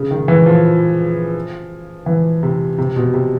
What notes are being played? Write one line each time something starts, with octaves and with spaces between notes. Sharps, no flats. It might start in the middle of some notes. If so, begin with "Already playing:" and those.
Already playing: C#3
D#3
E3
F3
E3
C3
C3
B2
C3